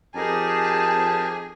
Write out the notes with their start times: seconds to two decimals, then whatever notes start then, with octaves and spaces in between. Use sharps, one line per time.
0.15 F2 D#4 G4 G#4 A#4 A5